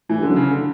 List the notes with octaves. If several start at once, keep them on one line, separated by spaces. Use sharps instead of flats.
A2 E3
G2
D3
F#2
C#3
D3